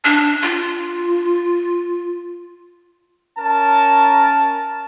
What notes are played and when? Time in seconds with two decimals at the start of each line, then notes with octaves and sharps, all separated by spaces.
0.05 D4
0.42 F4
3.38 C#4 A#4 A5